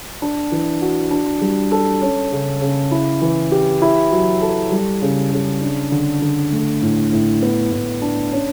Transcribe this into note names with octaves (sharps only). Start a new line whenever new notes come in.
D4
E3
F#4
D4
G3
A4
C#4
C#3
C#3
E4
E3
G4
E4
F#3
A4
G3
C#3
C#3
D4
D3
D3
A3
A2
A2
B3
A2
D4
C#4